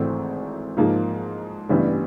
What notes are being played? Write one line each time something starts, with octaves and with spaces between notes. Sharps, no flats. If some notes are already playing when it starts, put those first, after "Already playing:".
Already playing: G#1 G#2 E3 A3 C4
G#2 F3 A#3 D#4
A1 G2 E3 G3 B3